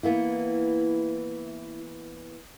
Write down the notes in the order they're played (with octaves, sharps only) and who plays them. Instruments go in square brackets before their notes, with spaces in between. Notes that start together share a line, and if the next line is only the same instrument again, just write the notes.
[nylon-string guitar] E3 A#3 B3 [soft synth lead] E4